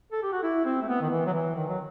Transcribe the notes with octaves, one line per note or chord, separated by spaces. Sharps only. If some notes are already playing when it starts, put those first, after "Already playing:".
A4
G4
F#4
E4
C4
A3
B3
D#3
E3
F#3
E3
D#3
F#3